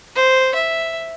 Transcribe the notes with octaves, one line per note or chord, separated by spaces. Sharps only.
C5
E5